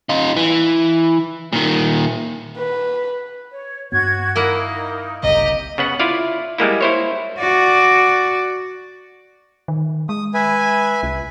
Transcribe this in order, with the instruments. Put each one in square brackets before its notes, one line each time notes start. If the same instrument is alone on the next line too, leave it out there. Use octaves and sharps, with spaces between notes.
[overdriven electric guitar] D#4 F4
E3
A#2 D#3
[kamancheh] B4
[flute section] C#5
[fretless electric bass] G2 B3 [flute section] F#4 G#6
[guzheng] A#3 E4 F#5 [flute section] D#4 A#4
[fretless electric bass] F#1 C2 [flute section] G4 A#5 [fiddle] D#5
[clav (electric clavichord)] C#3 B3 F#5
E4 F4 D5 F5
G3 G#3 A#3 E4
E4 C5 C#5
[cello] F#4 D5
[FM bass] D#3
[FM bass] G#3 [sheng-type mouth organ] D#6
[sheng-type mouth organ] B4 E5 G#5
[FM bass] C2